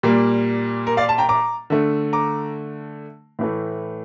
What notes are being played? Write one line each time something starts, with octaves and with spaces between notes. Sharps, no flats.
A#2 G3 A#3
A#4
D5 F5
A5
G5 A#5
A#5 D6
D3 A3
A#5 D6
A2 E3 A3